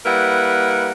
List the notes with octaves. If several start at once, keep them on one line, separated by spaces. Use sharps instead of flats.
G3 A#3 E4 A#4 B4 F#5